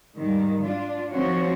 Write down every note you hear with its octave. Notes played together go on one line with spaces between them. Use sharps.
G#2 D#3 G3
D4 F4
D#3 F3 C4 F#4 C#5